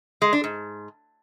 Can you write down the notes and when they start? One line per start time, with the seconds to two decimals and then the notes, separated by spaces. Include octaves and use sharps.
0.22 G#3
0.33 D4
0.44 G#2